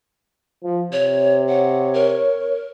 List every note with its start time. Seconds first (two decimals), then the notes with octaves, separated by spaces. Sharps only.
0.63 F3
0.92 C3 C#5
1.49 C#5 F#5
1.94 A#4